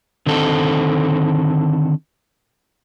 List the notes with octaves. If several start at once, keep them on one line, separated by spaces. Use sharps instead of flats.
D3 D#3 C4 A4